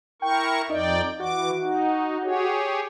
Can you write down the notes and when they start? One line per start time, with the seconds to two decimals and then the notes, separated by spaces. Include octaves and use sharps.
0.22 E4 A#4 G5 C#6
0.70 F2 D#4 D5 G5
1.20 E3 F#4 D6
1.62 D#4
2.23 G4 G#4 C#5